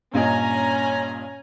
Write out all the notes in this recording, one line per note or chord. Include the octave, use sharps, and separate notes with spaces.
G2 A#2 C#4 D#5 G#5 A#5